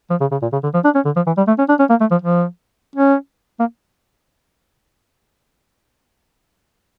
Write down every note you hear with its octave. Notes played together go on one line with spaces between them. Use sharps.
F3
C#3
C#3
A#2
C#3
D3
F3
D4
C#4
D3
F3
E3
G3
A3
C#4
D4
C#4
A#3
A3
F3
F3
C#4
A#3